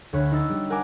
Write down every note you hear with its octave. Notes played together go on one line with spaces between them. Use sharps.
D2 C#5 B5 F#6
D#4 E6 A6
G3
A#4 F#5 G#5 A#5 D6